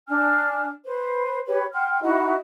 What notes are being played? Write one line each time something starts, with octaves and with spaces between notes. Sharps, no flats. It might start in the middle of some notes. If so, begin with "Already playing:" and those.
D4 G#5 F6
B4 C5
G4 B4 C#5
F#5 G5 C6 F6
D#4 E4 F#4 D#5